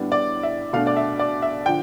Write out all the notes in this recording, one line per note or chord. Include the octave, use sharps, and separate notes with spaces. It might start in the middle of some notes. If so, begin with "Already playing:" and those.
Already playing: A2 G3 B3 D4
D5
E5
B2 A3 D4 F5
D5
E5
D5
E5
D3 F3 G5